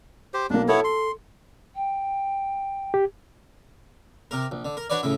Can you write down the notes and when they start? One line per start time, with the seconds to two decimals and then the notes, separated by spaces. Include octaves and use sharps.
0.34 G4 C5
0.50 B1 A#3 D4
0.68 B3 E4 A4 C#5
0.84 C6
1.73 G5
2.94 G4
4.31 C3 A#4
4.51 A#1
4.65 D3
4.77 A#4
4.90 D4 F#4 B4 C#5 D5
5.03 A2 C#3 E4